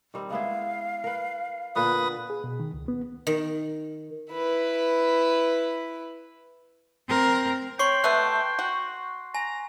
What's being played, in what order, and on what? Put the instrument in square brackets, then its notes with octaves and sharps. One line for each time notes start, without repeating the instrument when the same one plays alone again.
[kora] D#3 G3 C4
[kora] G#3 B3 E4 [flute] F5
[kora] A#4 B4
[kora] A#2 D3 B3 [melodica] B4 D#6
[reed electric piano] G#4
B2
D#3
C#2
B3
[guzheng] D#3
[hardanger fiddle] E4 B4
[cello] C4 A#4
[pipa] C#5 [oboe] G5 [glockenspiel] C6 C#6 C7
[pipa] B2 A3 B4 [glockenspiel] F#6
[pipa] F#4
[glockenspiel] G#5 [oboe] A#5